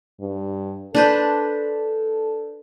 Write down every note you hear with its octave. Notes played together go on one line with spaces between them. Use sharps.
G2
D4 A4 B4 C5